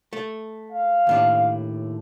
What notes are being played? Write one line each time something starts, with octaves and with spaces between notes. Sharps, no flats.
A3
F5
D#2 A2 D4